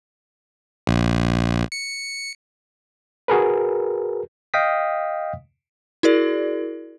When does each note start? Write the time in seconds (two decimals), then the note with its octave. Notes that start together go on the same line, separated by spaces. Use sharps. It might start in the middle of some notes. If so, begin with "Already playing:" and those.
0.87 A#1
1.72 C#7
3.28 F#4 G#4 A#4 B4
4.54 D#5 F5 G5 D#6 B6
6.03 E4 F#4 G#4 A#4 D5